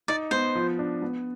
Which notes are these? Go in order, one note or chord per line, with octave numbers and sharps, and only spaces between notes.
D#4 D5
B3 C5
F3
D4
B3